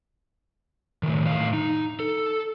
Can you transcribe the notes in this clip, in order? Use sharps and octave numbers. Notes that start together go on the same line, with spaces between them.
A2 D#3
A2 D#3 F5
D#4
A4